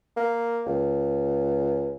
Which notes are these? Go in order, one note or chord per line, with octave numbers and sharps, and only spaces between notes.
A#3
C#2